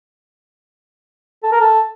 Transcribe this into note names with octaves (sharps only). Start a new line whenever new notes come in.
A4
A#4
A4